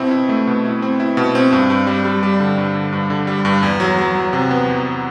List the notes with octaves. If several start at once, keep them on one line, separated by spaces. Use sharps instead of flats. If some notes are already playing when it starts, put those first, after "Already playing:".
Already playing: B2 C4 E4
E4
A3
B2
E4
C4
E4
B2
C4
G2
G2
G3
G3
G3
D3
G2
D3
G2
D3
G3
G2
E2
F#3
F#3
F#3
C3
B3
E2